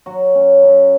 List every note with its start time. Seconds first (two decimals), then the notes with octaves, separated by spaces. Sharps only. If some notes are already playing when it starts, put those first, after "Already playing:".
0.06 F#3 F#4
0.35 C#4
0.63 F#2